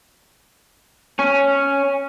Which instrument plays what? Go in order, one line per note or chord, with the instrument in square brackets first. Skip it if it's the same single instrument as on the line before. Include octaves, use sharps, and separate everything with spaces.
[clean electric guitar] C#4